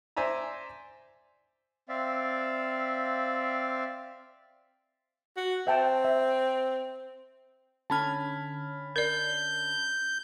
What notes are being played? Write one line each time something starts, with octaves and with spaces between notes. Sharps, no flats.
C5 D5 E5 G#5 A#5
C4 D5 E5 F5
F#4
C4 E5 G5 A5
E5
D3 C#4 A5 B5 F6 G#6
A#4 D5 G6